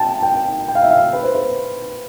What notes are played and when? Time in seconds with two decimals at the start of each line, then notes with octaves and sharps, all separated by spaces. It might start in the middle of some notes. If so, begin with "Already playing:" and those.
Already playing: G5 A5
0.23 G5
0.68 G5
0.75 F5
0.83 E5
0.91 F5
1.13 B4
1.23 C5
1.35 B4